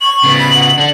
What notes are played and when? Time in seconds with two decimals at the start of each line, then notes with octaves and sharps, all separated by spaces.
0.01 C#6 F#7
0.24 C#3 B3
0.39 B5
0.55 F#5
0.78 D3 D4